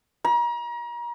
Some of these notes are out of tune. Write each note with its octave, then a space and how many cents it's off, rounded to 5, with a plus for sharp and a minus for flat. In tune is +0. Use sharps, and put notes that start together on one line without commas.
A#5 +35